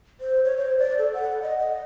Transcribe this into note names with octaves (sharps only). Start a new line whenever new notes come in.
C5
C#5
C5
D5
A4
F#5
D#5
D#5